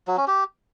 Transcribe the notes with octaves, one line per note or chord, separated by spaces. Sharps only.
F#3
C#4
G4